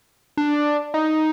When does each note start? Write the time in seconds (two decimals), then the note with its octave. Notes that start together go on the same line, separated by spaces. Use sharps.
0.37 D4
0.94 D#4